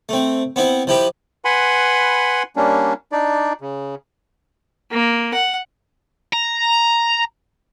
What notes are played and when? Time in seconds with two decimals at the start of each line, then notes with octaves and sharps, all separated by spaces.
0.09 A3 C4
0.56 B3 C4 E4
0.87 F3 E4 G4 B4
1.45 B4 F#5 G#5 B5 C6
2.56 G3 A#3 C#4 D4
3.12 D4 D#4 D5
3.61 C#3
4.91 A#3
5.33 F#5
6.33 A#5